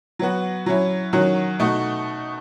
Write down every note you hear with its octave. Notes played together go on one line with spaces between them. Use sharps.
F#3 B3 F#4
F#3 C#4 E4
D#3 F#3 C#4 F#4
B2 A3 D#4 F#4